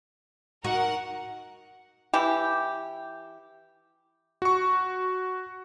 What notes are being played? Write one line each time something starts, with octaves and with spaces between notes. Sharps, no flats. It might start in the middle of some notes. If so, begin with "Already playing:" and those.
D#4 F#4 A#4 F#5
E3 G4
F#4 C#6